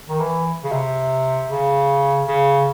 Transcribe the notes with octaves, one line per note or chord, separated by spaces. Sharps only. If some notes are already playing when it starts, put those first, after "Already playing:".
D#3
E3
C#3
C3
C#3
C#3